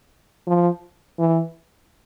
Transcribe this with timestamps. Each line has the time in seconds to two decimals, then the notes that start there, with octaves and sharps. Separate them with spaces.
0.47 F3
1.18 E3